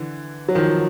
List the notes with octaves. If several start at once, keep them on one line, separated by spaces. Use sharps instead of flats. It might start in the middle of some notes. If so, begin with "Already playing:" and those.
Already playing: D3 E3
F#3
D#3 F3